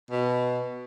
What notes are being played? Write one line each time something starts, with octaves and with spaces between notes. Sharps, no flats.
B2